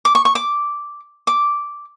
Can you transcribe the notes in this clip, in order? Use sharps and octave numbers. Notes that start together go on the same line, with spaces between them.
D6
C#6
C#6
D6
D6